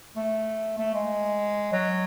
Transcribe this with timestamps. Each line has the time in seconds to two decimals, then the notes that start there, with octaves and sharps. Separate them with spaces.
0.17 A3
0.79 A3
0.95 G#3
1.73 F#3